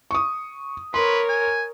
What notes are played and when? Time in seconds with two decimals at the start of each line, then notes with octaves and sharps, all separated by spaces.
0.11 C#6 D#6
0.94 A#4 B4 C#5 C6
1.29 G#5